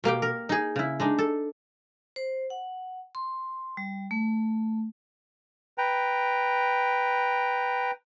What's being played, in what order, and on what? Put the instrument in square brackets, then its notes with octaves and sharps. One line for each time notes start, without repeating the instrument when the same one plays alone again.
[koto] B2 A#3 G4 G5
A#4
D#4 G#4
C#3 E4
G#3 D4 D#4
A4
[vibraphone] C5
F#5
C6
G3
A3
[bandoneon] B4 G5 A#5